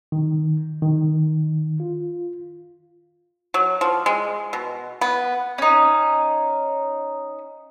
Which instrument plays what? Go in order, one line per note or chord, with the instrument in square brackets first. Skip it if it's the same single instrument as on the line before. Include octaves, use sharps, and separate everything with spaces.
[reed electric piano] D#3
D#3
F4
[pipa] F#3
F3
G#3
B2
B3
[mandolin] C#4 D#4